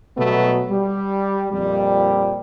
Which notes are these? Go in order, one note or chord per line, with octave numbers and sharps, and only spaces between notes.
B2 F#3 G3 A3 B3
G3
F2 A#2 G3